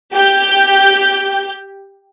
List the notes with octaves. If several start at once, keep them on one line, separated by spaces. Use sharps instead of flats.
G4 G6